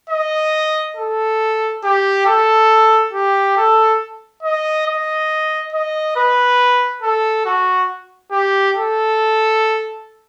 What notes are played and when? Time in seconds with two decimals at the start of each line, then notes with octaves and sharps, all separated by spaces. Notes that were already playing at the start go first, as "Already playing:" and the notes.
0.10 D#5
0.97 A4
1.84 G4
2.26 A4
3.13 G4
3.57 A4
4.43 D#5
4.86 D#5
5.73 D#5
6.16 B4
7.02 A4
7.46 F#4
8.32 G4
8.76 A4